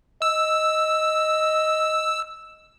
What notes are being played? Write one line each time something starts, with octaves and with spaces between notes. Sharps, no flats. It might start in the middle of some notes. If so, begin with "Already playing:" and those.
D#5 E6